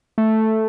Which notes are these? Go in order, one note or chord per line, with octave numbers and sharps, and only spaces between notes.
A3